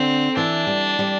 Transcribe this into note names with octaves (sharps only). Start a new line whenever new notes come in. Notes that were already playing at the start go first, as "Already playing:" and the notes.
Already playing: D3 C4
E3 D4
G3
G3